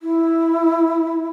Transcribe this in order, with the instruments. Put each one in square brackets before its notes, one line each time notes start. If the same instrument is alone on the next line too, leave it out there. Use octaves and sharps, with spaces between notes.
[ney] E4